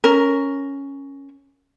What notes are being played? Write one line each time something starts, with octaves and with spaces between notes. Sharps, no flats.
C#4 A#4